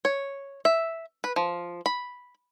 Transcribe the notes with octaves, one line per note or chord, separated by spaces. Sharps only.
C#5
E5
B4
F3
B5